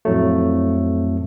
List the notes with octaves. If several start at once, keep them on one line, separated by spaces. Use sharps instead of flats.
F2 A2 F#3 A3